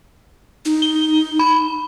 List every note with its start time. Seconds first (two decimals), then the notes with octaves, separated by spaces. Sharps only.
0.65 D#4
0.82 G7
1.39 B5